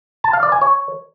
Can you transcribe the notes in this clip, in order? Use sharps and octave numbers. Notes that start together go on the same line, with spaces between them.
A5
F5
D5
G#5
C#5